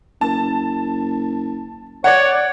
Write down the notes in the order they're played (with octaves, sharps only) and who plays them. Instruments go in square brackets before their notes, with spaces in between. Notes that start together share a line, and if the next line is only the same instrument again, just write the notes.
[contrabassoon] F#1 [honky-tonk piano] A5
[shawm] C#5 [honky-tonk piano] D5 F#5